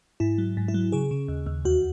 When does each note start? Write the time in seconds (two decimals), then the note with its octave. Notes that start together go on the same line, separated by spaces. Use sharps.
0.20 G#2 E4
0.38 F#3
0.57 G#2
0.68 E4
0.74 F#3
0.92 C#3 G#4
1.11 C#3
1.28 D#2
1.46 D#2
1.65 E2 F#4